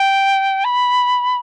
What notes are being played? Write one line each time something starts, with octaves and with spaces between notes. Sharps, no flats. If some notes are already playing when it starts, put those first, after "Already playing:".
Already playing: G5
B5